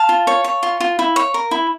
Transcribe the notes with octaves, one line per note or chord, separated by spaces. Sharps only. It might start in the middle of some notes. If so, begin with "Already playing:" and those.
Already playing: F5 A5
F4
C#5
C#5
F4
F4
E4
C#5
A#4
E4